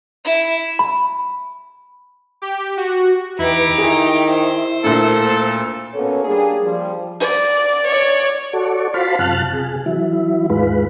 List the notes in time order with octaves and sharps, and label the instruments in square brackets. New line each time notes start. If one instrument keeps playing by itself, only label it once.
[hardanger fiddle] E4
[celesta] B5
[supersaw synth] G4
F#4
[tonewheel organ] E2 B4 [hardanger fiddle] D#4 G4 [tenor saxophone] E4
[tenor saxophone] D#3 [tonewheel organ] E4 [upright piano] G#4
[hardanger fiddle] C5
[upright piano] D2 A#2 [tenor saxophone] A4
[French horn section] B2 A#3 B3 C#4 A4 C#5
G3 A#3 D4 G#4
F3 G3
[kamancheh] D5
C#5 D5
[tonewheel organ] F#4 A4 C#5 D5
F4 F#4 C5 F5 A5 B5
F#2 C3 F4 A5 F6 F#6
C3 G#4
E3 F#3 E4
D#2 G#2 G#3 F4 B4